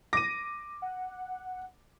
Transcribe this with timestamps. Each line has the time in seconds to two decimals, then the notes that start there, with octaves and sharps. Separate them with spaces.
0.13 D6 A#6 D#7
0.82 F#5